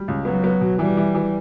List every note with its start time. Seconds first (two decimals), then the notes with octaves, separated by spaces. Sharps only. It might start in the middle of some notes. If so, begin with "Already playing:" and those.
Already playing: G3
0.08 C#2
0.25 F#3 B3
0.44 B3
0.61 B2
0.79 E3 G3
0.97 E3
1.15 E3